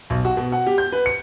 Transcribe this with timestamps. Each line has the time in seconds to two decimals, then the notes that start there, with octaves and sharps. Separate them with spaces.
0.10 B1
0.25 F#4
0.37 B2
0.52 F#5
0.67 G4
0.78 G6
0.92 B4
1.06 C#7